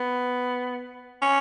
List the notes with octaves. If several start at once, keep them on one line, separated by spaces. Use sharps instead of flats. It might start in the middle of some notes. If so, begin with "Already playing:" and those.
Already playing: B3
C#4